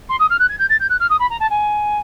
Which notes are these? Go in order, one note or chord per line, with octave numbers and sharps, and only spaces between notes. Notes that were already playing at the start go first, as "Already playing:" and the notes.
C6
D#6
F6
F#6
G#6
G6
A6
G6
F#6
F6
D#6
B5
A#5
A5
G#5